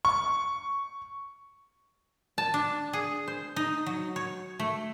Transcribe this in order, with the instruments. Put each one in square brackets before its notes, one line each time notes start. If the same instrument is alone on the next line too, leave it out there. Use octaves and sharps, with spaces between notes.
[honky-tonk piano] C#6
[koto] A5
D4
G#4
C5
D#4
F#3
C#5
A3